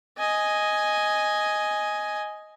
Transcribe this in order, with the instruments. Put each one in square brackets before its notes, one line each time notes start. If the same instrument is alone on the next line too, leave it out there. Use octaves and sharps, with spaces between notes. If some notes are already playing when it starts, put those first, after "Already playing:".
[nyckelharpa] D#5 G#5